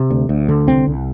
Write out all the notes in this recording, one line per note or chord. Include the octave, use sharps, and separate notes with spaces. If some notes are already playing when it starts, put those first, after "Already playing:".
Already playing: C3
D2
D2
D3
C2 C4
C2